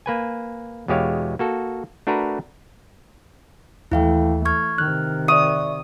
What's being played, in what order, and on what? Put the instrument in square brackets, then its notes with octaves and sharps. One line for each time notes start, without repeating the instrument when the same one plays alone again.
[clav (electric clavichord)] A#3 B4 G#5
E2 B2 G#3 G4 C#5 F5
A#3 F#4 A4
A3 D4 F#4 A#4 B4 A#5
[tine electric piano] D#2 [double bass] E3 A3 [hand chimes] E4 F5 G5
[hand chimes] C#6 F6 G#6
[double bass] C3 D#3 [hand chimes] F6 [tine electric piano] F#6
[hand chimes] D5 E5 C#6 [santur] D#6